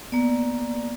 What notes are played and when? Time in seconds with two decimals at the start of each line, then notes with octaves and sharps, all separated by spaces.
0.12 A#3 B3 D5